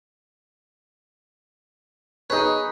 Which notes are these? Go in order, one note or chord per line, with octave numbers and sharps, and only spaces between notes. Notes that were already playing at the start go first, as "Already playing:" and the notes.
D#4 G#4 B4 C#5